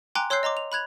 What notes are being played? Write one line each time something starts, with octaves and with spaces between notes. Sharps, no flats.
G5 G#5 A#5 C6 D6 F#6
C#5 C6 E6 F#6 G6 C7
D#5 A#5 C6 D6
F7
B5 F#6 G#6 F7